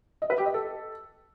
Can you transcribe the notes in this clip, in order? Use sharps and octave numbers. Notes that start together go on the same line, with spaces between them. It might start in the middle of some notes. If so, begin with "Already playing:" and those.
D#5
B4
G4
D#5
A4